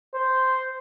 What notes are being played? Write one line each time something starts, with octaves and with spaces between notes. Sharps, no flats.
C5